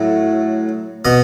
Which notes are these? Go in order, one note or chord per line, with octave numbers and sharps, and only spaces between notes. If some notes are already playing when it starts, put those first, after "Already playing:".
Already playing: A2 F#3
B2 D#5